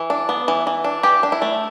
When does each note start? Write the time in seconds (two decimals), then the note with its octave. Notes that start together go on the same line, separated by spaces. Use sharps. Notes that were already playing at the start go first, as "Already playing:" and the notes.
Already playing: E3
0.10 D4
0.29 B3
0.48 E3
0.67 E3
0.84 D4
1.03 E3 G4
1.23 D4
1.32 E4
1.42 A3